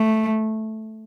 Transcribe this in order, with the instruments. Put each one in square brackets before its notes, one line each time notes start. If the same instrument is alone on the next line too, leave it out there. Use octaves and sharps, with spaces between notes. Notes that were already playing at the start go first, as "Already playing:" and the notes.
Already playing: [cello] A3